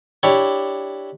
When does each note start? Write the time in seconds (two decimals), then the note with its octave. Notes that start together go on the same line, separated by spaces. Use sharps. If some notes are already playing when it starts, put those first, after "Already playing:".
0.23 D4 E4 G4 C#5